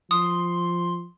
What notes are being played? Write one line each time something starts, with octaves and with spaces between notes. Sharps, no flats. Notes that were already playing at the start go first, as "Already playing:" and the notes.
F3 C6 D#6